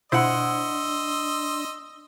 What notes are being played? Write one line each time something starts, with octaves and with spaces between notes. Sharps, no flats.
B2 D4 E4 C5 D#5 F#5 C6 E6